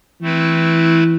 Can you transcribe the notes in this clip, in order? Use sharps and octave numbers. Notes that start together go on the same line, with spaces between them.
E3 A3 C4 E4 B4